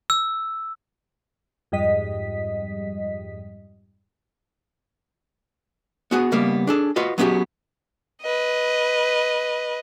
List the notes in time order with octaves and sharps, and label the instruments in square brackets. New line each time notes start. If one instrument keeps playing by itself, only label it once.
[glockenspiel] E6
[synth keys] F2 G#2 G3 D#5 B6
[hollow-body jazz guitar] B3 F#4 G#4
C#3 G3 A#3 B3
D4 G#4 A4
F4 F#4 B4 D#5
F#3 B3 C#4 D#4 G4 G#4
[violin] B4 D#5